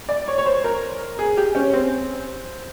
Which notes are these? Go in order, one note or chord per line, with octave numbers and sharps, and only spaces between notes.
D5
C#5
C#5
C5
A#4
G#4
G4
C#4
C4